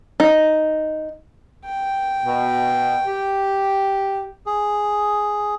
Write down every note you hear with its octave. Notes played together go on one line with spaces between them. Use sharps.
D#4
G5
B2
G4
G#4